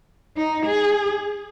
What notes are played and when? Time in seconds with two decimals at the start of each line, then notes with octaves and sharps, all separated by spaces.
0.36 D#4
0.66 G#4